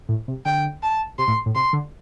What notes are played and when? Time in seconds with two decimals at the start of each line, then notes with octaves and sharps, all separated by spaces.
0.09 A2
0.28 C3
0.45 D3 G5
0.83 A5
1.18 C3 C6
1.28 A2
1.46 A2
1.55 C3 C6
1.73 D3